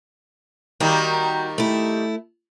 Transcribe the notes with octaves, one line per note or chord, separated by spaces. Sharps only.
D#3 G3 A#3 F#4
A3 E4